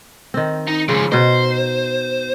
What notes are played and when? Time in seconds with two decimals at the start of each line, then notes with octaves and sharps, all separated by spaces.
0.34 D#3 C4
0.67 D#4
0.89 C#3 F3 G#3
1.12 B2 D#4 C5